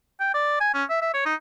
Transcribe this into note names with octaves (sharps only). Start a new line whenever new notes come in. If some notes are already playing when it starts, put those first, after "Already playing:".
G5
D5
G#5
C#4
E5
E5
C#5
D#4